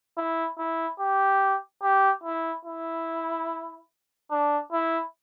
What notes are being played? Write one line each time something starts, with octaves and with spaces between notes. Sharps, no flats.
E4
E4
G4
G4
E4
E4
D4
E4